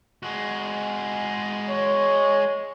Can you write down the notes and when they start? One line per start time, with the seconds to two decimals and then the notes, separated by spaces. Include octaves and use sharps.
0.23 G#3 F#4
1.70 C#5